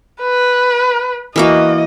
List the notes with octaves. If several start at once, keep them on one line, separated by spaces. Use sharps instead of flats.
B4
E3 A#3 F#4 D#5